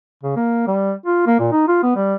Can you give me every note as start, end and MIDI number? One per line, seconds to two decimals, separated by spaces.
0.23 0.34 49
0.36 0.65 58
0.67 0.93 55
1.06 1.23 65
1.27 1.36 58
1.39 1.51 46
1.52 1.67 63
1.68 1.80 65
1.83 1.92 59
1.96 2.16 55